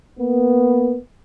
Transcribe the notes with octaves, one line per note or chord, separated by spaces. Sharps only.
A#3 B3